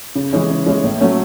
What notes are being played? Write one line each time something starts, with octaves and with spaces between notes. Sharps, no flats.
C#3
E3 G#3 C#4
C#3
E3 G#3 C#4
A2
F#3 A3 C#4